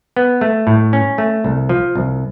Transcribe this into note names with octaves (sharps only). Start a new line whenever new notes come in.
B3
A3
A2
C#4
A3
C2
F3
C2